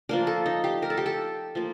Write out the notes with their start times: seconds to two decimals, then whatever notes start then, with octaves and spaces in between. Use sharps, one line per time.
0.09 F3 A#3 D4 A#4
0.27 A4
0.46 D#4
0.64 G4
0.82 A#4
0.90 A4
0.97 G4
1.06 A4
1.55 F3 A#3